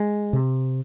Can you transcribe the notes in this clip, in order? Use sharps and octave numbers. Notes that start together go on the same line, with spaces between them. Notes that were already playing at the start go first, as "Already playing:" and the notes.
Already playing: G#3
C3